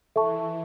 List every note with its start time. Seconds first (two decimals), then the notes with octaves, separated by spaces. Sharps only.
0.16 E3 A4 E5 A5 C#6